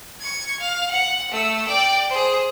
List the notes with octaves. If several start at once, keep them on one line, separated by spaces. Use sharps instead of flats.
C#6 G#6
F5
F#5
A3 E6
D5 G5
G#4 C5